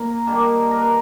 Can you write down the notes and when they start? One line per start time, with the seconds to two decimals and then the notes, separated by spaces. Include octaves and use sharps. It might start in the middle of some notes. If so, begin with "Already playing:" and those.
Already playing: A#2 A#3 A#4
0.27 D#3 G3 A#3 D4
0.71 A#4
0.77 B4